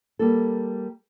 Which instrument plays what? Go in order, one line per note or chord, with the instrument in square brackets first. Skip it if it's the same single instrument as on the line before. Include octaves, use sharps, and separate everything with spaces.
[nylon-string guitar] G3 A#3 A4